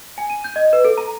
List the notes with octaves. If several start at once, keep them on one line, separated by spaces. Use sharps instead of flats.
G#5
D#7
G6
D#5
B4
A4
A#5